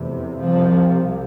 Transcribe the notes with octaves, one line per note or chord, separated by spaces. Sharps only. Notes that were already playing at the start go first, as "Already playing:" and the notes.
Already playing: F1 E2 C3
C2 C3 F3
C2